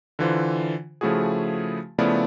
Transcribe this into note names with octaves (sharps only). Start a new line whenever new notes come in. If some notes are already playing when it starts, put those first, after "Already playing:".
D3 E3 F4 C5
C#3 F3 A3 E4 F#4 G#4
C#3 F3 A3 B3 E4 D5